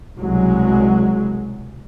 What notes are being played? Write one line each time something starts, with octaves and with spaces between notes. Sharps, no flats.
C2 B2 F#3 G#3